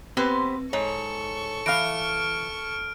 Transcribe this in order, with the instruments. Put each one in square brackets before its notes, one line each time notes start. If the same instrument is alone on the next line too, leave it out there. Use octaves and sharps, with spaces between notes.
[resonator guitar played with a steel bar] B3 G4 C5 [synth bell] C4 B4
[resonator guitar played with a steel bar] G#2 [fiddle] A4 C#6 [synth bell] C#5
[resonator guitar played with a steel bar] E3 F5 [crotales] F6 D7